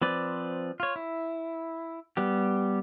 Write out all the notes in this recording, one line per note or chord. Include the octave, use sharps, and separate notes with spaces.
F3 C4 B4 D5
F4 C#5
E4
G3 B3 G4